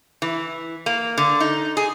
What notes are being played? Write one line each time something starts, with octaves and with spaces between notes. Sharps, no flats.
E3
A#3
D3
D#4
G#4